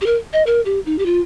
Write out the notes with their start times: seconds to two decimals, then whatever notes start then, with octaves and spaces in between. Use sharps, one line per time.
0.01 G4
0.06 A#4
0.33 D#5
0.47 A#4
0.66 G4
0.86 D#4
0.99 G4
1.06 F4